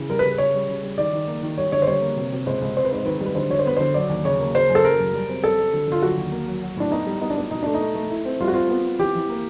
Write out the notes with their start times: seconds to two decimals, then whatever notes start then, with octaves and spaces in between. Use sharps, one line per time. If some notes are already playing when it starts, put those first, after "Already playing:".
Already playing: C#3 E3
0.09 G3 A#4
0.19 C#3 B4
0.38 C#3 C#5
0.54 G3
0.69 C#3
0.83 G3
0.98 D#3 D5
1.13 D#3
1.28 A#3
1.43 D#3
1.57 G3 C#5
1.72 D3 C#5
1.82 C5
1.87 G3 C#5
2.02 A#3
2.17 C3
2.32 C3
2.46 C#2 C5
2.61 C#2
2.76 C4 C5
2.85 B4
2.91 G#2 C5
3.05 D#3 B4
3.20 G3
3.26 B4
3.35 D3 C5
3.50 D3 C#5
3.59 C5
3.66 B3 B4
3.77 D3 C5
3.94 F#3 D5
4.09 D#2
4.24 C#3 C#5
4.39 A#3
4.55 C#3 C5
4.69 F#2
4.75 A4
4.84 F#2 A#4
4.99 F#2
5.13 G3
5.29 C4
5.43 G3 A4
5.58 G3
5.73 D3
5.88 D3 F4
6.02 F#3 F#4
6.17 D#2
6.32 A#3
6.47 F#3
6.62 F#3
6.77 A2 D4
6.92 B3 D#4
7.06 G3
7.21 B3 D#4
7.30 D4
7.37 B3 D#4
7.51 B2 D#4
7.63 A3 D4
7.74 D#4
7.81 A3
7.95 A3
8.10 E4
8.25 C4
8.40 G3 F4
8.48 F#4
8.54 C4 F4
8.69 B3
8.85 B3
8.99 E3 G4
9.15 E3
9.29 A#3